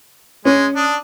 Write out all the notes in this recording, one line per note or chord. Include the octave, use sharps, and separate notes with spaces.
G#3 C#4
D4 D#6